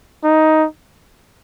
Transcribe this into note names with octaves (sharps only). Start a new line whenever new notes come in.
D#4